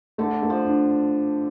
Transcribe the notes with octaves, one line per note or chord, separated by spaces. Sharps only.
D3 A3
A3
F3
D4